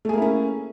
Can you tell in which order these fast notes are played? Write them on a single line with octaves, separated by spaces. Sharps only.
A3 G#4 A#3 E4 C#4